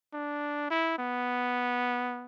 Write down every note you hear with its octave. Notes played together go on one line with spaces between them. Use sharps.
D4
E4
B3